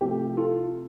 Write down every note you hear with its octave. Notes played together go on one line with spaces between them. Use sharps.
C3 F3 A3 G4
F4 A4